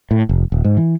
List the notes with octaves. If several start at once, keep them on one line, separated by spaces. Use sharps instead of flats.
A2
F1
D#1
G#2
E3